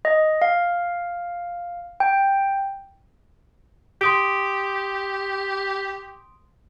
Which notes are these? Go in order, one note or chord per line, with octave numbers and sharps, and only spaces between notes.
D#5
F5
G5
G4 C6 D#6 D7